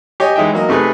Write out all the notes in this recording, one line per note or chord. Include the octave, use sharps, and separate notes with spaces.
G4 C#5 D#5 G#5
E3 G#3 D#4 E5 G5
F#3 A#3 D#5
C3 A3 D#4 G#4 B4